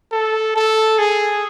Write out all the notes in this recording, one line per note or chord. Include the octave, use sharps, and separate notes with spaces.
A4
A4
G#4